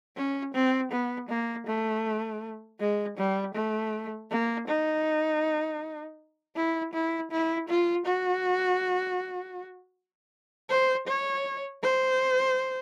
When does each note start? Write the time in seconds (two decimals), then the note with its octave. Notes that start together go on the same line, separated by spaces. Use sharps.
0.16 C#4
0.54 C4
0.91 B3
1.29 A#3
1.67 A3
2.79 G#3
3.17 G3
3.54 A3
4.31 A#3
4.68 D#4
6.56 E4
6.94 E4
7.31 E4
7.69 F4
8.06 F#4
10.70 C5
11.07 C#5
11.83 C5